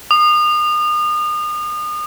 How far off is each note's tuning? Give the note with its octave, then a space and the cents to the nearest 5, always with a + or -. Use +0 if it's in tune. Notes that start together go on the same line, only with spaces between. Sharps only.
D#6 -35